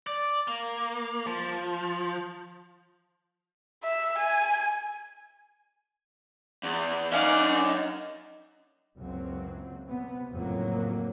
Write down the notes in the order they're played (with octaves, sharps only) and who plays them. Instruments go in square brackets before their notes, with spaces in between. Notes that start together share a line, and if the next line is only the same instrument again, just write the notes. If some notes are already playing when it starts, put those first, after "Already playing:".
[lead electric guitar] D5
A#3
F3
[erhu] E5
G#5
[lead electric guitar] E2
[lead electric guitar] F#3 E5 [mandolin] A#3 C#4 D5 [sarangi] D#4
[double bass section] F#1 C#2 F#2 F#3 C4
C3 B3
F#1 F2 A2 F#3 A#3